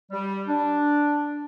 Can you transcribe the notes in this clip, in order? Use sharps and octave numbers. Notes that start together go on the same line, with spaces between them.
G3
D4